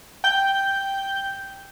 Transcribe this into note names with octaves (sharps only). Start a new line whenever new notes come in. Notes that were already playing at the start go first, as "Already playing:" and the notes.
G5 G6